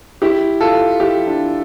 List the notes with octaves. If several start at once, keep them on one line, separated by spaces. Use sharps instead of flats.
E4 G4
F4 A4
E4 G4
D4 F4